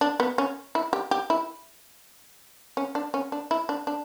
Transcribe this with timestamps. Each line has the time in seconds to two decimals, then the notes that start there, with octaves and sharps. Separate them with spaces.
0.01 D4
0.20 B3
0.38 C#4
0.75 E4
0.93 G4
1.11 G4
1.30 E4
2.77 C#4
2.95 D4
3.14 C#4
3.32 D4
3.51 E4
3.69 D4
3.87 D4